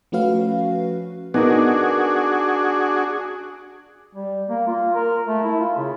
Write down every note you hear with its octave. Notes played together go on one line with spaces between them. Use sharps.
F3 A3 C#4 F#4 B4 F5
B3 D4 D#4 F#4 G#4 A#4
G3
A#3
F4
A#4
A3
E4
F4
C#3